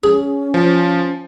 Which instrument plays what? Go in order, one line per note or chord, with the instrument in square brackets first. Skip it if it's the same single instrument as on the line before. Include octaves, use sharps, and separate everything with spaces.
[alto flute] C#4 [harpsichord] G#4
[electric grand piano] F3